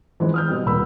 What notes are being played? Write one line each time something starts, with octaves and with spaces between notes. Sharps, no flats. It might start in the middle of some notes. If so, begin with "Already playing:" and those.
E3 F3 G#3 C5
D#6 F6 G6
B2 G3
D#1 B3 B5 E6